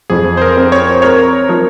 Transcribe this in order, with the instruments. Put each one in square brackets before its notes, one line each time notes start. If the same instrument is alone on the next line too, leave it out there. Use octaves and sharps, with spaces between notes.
[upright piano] F2 [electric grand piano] G#4
[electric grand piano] C5
A#4
[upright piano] C4
[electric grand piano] C#5
[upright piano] A#4 [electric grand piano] C#5
[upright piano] F3